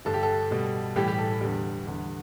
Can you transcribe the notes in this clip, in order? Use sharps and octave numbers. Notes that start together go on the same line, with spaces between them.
G2 D3 G3 A4
G4
A4
B2 G3
A2 E3 G3 G4
G4
A4
E2 D3 G3
E2 D3 G3